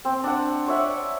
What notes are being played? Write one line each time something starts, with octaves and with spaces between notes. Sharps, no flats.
C4
D4 F#5
C#5 D5 E5 F#5